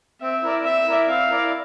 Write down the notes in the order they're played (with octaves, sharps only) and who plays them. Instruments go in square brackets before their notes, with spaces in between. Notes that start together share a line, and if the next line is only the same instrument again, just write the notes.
[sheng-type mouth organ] C4 [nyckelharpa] E5
[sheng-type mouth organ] E4 A#4 D5
[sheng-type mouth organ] C4 [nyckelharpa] E5
[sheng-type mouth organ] E4 A#4 D5
[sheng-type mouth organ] C4 [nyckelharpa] F5
[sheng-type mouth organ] E4 A#4 D5